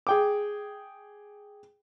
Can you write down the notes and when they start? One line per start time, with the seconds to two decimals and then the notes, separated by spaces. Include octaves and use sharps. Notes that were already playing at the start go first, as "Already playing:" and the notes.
0.07 G#4 G5 D6